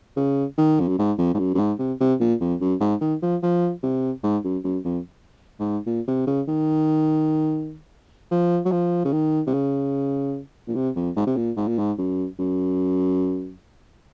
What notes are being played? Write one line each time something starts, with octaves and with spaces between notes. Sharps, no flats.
C#3
D#3
F2
F#2
G#2
F2
G#2
F#2
F#2
G#2
C3
C3
A#2
F2
F#2
G#2
D#3
F3
F3
C3
G#2
F#2
F#2
F2
G#2
A#2
C3
C#3
D#3
F3
F#3
F3
C#3
D#3
C3
C#3
A#2
C3
F2
G#2
C3
A#2
G#2
A#2
G#2
F#2
F#2